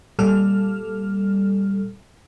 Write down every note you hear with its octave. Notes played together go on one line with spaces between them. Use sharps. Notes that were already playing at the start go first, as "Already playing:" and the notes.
A#2 G3 A4 F6